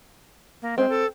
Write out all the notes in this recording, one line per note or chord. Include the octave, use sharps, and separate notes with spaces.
A#3
G#3 C4
A4